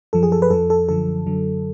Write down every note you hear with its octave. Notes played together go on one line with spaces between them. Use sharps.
F#2 F3 A4
G#4
A4
B4
F2 F3 A4
A4
F#2 D3 F3 A4
F#2 D3 F#3